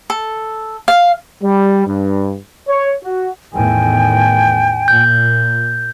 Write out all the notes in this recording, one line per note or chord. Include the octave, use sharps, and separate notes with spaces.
A4
F5
G3
G2
C#5
F#4
E2 A2 D#3 G5 G#5
A#2 G6